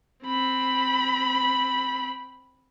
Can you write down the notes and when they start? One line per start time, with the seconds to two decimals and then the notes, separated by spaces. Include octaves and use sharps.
0.24 C4 B5